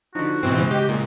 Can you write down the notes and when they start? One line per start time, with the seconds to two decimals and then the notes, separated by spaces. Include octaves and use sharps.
0.15 D3 F3 D#4 F#4
0.43 G#2 B2 E3 C4
0.58 C#3 G#3
0.71 G4 D#5
0.89 A#2 G#3